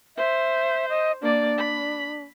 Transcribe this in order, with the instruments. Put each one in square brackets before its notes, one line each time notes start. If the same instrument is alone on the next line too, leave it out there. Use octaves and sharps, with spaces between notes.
[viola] C5 [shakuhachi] E5
[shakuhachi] D#5
[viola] A#3 D5 [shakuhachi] D4
[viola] B5